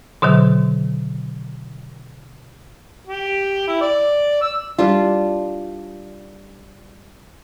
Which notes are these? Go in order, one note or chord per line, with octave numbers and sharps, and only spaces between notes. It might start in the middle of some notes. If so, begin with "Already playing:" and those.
B2 D3 D#3 F#3
G4
E4
D5
E6
G3 D4 F4